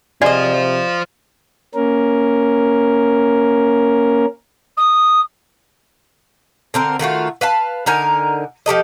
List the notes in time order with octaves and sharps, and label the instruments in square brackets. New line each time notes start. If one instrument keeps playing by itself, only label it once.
[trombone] C3 [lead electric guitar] F4 C5 [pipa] G#4 D#5 [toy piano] D5
[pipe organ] A#3 C#4 A#4
[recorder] D#6
[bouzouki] D3 C4 A#4
D#3 A3 F4 F#4
B4 F5 A5
D3 D#4 A#4 G#5
F3 G4 A4 D#5